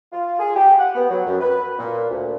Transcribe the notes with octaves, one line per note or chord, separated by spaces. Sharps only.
F4
G#4
G4
F#5
B3
F#3
F#2
B4
A#2
D2